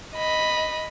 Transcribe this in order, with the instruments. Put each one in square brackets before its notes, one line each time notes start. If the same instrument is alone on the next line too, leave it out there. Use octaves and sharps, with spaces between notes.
[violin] D#5 B5